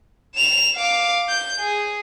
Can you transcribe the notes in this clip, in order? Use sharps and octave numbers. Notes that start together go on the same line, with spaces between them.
E7 F7
F5 D6
G6
G#4